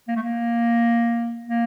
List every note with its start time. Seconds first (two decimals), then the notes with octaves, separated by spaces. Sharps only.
0.08 A#3
0.16 A3
0.22 A#3
1.46 A#3